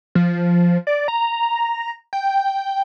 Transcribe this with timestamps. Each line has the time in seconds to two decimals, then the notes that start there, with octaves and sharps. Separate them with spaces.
0.15 F3
0.87 D5
1.08 A#5
2.13 G5